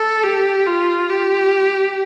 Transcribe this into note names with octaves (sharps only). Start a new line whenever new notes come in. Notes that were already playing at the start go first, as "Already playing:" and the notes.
Already playing: A4
G4
F4
G4